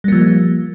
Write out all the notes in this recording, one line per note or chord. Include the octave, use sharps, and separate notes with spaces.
F3 G3 A#3